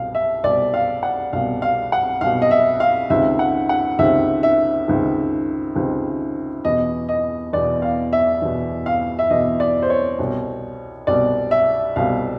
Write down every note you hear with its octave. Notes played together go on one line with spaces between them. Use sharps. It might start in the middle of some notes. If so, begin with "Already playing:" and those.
Already playing: C2 B2 F5
E5
C2 B2 D5
F5
F#5
C2 B2 F5
F5
F#5
C2 B2 F5
D#5
E5
F5
C#2 C3 D#3 E5
F#5
F#5
C#2 C3 D#3 E5
E5
C#2 C3 D#3
C#2 C3 D#3
E2 B2 D#5
D#5
E2 B2 D5
F5
E5
E2 B2
F5
E5
E2 B2 D#5
D5
C5
C#5
C2 B2
C2 B2 D5
E5
C2 B2 F5